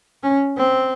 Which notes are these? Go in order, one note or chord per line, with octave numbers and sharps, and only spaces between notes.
C#4
C4